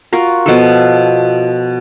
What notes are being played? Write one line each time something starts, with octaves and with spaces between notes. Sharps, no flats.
F4 F#4 A#4
B2 F3 A4